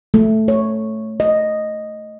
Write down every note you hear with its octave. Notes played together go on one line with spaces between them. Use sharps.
A3
C#5
D#5